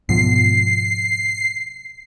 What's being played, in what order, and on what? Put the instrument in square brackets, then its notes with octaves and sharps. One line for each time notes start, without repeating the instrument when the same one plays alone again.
[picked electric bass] G#2 B2 F3 [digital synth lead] C7